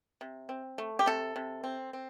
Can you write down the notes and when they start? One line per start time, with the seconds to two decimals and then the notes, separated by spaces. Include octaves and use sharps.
0.21 C3
0.49 C4
0.78 A3
0.99 G4
1.06 C3 A4
1.36 C3
1.64 C4
1.93 C4